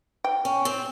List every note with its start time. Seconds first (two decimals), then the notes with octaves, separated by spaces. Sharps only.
0.24 G5
0.45 C#4
0.65 C4